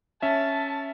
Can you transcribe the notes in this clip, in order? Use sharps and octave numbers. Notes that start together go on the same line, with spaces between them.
C#4 E5 A5